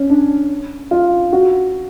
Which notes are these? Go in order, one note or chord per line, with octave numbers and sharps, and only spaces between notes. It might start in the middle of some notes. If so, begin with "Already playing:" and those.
Already playing: C#4
D4
F4
F#4